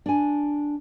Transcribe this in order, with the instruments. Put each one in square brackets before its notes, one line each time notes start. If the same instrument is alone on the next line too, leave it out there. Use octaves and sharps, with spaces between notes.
[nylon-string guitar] D4 G#5